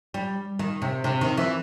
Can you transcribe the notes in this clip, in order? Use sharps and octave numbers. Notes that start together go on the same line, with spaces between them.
G3
D#3
C3
C3
D#3
E3